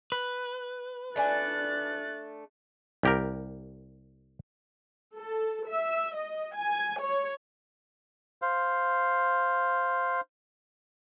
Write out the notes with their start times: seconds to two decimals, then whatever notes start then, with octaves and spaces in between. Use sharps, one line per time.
0.12 B4
1.16 A3 D4 G#5 F#6 A6
3.03 C2 G4 A#4
5.17 A4
5.68 E5
6.15 D#5
6.55 G#5
7.00 C#5
8.42 C5 F5